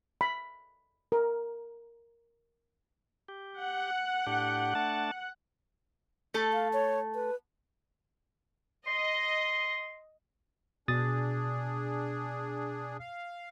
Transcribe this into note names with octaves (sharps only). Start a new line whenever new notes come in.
B5
A#4
G4
F#5
A2 D4 G4
A3 D4 A5
A3 A4
F5
C#5
B4
D#5 C6
B2 D4 G#4 D#6 A6
F5